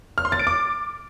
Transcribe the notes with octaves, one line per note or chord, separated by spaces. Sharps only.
F6
C6
A6
D7
D6